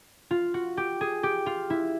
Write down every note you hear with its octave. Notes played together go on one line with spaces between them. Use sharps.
F4
F#4
G4
G#4
G4
F4
E4